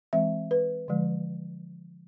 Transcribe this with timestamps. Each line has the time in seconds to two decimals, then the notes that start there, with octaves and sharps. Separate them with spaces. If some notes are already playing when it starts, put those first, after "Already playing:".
0.13 E3 G#3 C4 E5
0.51 B4
0.88 D3 F3 G#3